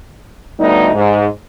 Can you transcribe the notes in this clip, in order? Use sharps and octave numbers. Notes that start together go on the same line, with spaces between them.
D2 A2 G3 B3 D#4
G#2